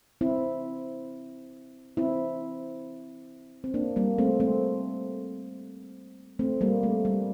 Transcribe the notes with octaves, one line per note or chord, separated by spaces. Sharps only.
C4 E4
C4 E4
C4
A#3 D4
G3 A#3
A3 C4
A3 C4
A3 C4
G3 A#3
A3
G3